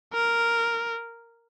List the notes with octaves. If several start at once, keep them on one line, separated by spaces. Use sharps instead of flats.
A#4